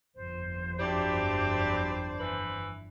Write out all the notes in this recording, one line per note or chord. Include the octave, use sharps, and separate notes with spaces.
G1 F2 C5
F#3 D4 E4 G4 D5
E3 B4